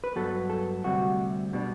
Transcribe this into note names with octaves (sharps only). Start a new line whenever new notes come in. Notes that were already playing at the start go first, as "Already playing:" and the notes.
B4
G2 F#3 B3 A4
A4
D2 C3 G3 F#4
B2 G3 D4